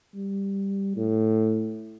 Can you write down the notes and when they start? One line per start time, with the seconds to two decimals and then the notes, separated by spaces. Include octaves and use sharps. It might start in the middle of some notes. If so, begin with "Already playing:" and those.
0.15 G3
0.96 A2